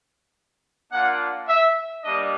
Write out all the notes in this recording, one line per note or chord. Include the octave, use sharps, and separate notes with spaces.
A#3 D4 F4 F#5
E5
G3 A#3 D4 D#5